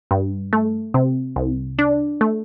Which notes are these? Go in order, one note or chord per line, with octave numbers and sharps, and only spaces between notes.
G2
A3
C3
C2
D4
A3